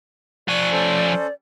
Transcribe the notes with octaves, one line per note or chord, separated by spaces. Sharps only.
F3 D5 G#5 C#6 F#6
C#4 A4 C5